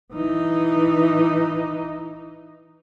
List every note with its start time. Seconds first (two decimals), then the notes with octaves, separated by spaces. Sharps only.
0.13 E3 D#4